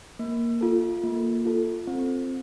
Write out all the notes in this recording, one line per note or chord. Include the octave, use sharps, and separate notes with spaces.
A#3
F4 A4
A#3
F4 A4
C4